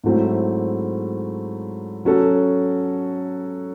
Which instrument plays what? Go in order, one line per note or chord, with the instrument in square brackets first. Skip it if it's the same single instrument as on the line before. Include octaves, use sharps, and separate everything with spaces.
[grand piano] G#2 F#3 A3 C4 E4
F#3 C#4 F#4 A4